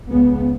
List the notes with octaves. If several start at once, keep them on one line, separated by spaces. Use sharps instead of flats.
C#2 C#3 B3